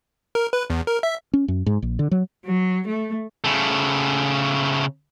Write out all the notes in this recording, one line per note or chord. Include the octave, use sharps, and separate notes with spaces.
A#4
B4
E2
A#4
E5
C#4
F#2
G#2
A#1
D3
F#3
F#3
A3
C#3 A3